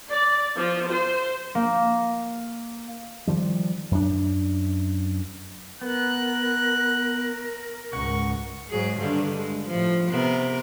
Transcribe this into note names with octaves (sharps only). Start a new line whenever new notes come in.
D5
F3
C5
A#3
D#3 F3 G3
F#2 D4
B3 A#4 F#6
C#2 G#2 F#5 C#6
G#2 F#3 G#4
G2 D3 D#3
G#3
A2 F3
C3 B3 A#4